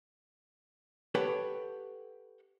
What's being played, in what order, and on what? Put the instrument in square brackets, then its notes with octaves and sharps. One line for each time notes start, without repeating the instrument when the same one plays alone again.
[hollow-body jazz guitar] G4 A4 B4 C#5 F#5 G5